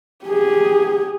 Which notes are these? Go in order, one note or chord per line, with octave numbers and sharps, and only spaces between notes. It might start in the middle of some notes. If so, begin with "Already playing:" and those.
G4 G#4